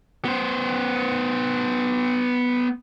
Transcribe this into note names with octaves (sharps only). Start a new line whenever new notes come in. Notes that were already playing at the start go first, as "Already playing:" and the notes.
B3 C5